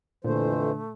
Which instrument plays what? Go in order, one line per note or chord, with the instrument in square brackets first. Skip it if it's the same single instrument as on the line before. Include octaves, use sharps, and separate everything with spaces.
[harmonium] F2 E3 C5 [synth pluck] A#2 [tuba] D3 [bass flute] A3